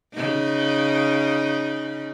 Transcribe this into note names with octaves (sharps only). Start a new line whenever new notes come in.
C#3 D#4